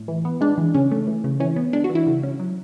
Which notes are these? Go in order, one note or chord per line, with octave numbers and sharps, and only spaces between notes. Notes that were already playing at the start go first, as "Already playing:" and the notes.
Already playing: A2
E3
B3
G#3 D4
E3
C#3 C#4
A3
E3
C#3
E3 C#4
B3
G#3 D4
F#4
E3
E4
C#3
C#4
F#3